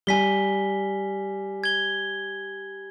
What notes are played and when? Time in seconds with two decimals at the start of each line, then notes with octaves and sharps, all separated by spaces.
0.07 G3 G#5 B6 G7
1.64 G#6 G7